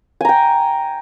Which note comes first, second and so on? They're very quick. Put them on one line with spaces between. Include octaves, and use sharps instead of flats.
G#5 A#5 G5